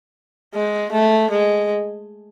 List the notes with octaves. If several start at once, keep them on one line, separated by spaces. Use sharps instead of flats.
G#3
A3
G#3